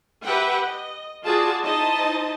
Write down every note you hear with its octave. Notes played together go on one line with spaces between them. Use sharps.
G4 B4 E5 F#5 G5
D#5
F4 F#4 G#4 D5 A5
D#4 E4 C5 D#5 A5